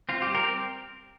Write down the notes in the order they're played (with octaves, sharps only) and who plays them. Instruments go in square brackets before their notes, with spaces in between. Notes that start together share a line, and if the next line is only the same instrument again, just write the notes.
[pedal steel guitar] C4 F4
G4
G3
G4 A#4
C4